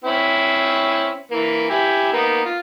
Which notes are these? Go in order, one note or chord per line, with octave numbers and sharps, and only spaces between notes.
C4 C#4 E4
E3 A#3
E4 G4 G#5
A#3 B3 D#4
F4